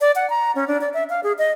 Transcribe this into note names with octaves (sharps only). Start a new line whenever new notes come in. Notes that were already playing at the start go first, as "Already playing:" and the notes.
D5
F#5
A#5
C#4
D4
D5
E5
F5
G#4
D#5